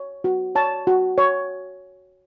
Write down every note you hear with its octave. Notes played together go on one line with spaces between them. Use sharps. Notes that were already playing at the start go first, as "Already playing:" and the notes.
Already playing: C#5
F#4
C#5 A5
F#4
C#5